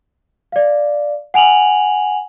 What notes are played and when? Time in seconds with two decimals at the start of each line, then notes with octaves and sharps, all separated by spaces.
0.52 D5 F5
1.34 F#5 G#5 F7 F#7